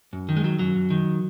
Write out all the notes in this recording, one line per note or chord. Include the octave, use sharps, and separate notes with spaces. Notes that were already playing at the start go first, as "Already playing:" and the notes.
F#2
D#3
G#3
F#3
F#2 F#3
F#2
D#3